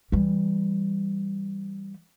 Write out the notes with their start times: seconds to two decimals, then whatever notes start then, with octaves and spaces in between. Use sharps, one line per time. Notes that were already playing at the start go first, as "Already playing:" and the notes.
0.12 E3 G3